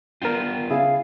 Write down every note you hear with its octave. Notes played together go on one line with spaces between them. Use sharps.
B3 D4 F4 A#4 G5
C#3 E4 G#4 F5